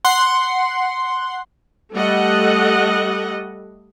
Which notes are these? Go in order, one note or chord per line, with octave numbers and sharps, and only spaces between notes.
F#5 C6
G3 A3 A4 D#5 F#5